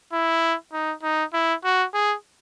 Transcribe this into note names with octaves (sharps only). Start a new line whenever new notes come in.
E4
D#4
D#4
E4
F#4
G#4